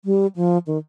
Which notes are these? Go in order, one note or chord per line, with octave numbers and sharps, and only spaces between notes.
G3
F3
D#3